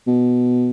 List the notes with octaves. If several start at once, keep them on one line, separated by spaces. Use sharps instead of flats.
B2